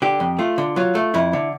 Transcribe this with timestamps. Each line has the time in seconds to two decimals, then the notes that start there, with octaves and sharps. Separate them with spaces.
0.02 D3 G4
0.20 F2
0.39 A3 F4
0.58 D3
0.76 F#3 F4
0.95 A3
1.14 F2 E4
1.33 D3